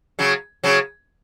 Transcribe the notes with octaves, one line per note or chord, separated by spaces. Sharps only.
C#3 F#3
C#3 F#3